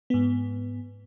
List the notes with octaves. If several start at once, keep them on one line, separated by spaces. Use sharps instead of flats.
G#2 B3